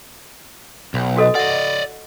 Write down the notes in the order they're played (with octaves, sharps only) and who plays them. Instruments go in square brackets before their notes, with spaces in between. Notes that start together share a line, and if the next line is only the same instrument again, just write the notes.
[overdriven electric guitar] B1
[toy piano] F#4 A4 D#5
[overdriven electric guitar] D5 D#5 [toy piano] F#5